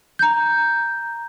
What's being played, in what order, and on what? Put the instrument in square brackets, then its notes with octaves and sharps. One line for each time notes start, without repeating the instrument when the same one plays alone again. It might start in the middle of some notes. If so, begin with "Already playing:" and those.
[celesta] A#5 G6